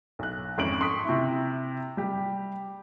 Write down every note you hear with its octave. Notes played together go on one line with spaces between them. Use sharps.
B1 F#6
G#1 F2 C#4 D7 F#7
C6 C#6 D#6 B6
C3 E4
G3 G4